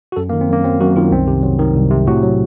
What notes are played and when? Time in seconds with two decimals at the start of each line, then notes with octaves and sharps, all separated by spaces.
0.12 F#4
0.16 F#2 A4
0.29 A#3
0.33 D#3
0.41 C4
0.48 F#2 A#3
0.64 F#3 C4
0.80 F#2 F#4
0.96 D#3 F4
1.11 C2 C4
1.27 C3
1.43 F#3
1.59 D#3
1.76 C2
1.91 C3
2.07 A2 F#4
2.23 F#3